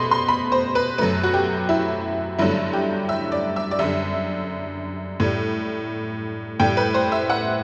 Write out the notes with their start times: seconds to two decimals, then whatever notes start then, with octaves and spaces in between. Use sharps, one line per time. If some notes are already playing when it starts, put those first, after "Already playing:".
Already playing: B2 A3 B5 C6
0.11 C6
0.28 B5
0.52 C5
0.75 B4
0.98 F#2 F#3 A3 B4
1.23 F#4
1.34 G4
1.69 E4
2.39 G2 D3 F#3 A3 E4
2.73 G4
3.09 E5
3.32 D5
3.56 E5
3.71 D5
3.79 F#2 D3 G3 E5
5.20 A2 G3
6.59 A2 G3 G5
6.77 B4
6.94 C5
7.12 E5
7.30 F#5